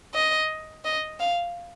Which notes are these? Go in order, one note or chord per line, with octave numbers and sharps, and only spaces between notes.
D#5
D#5
F5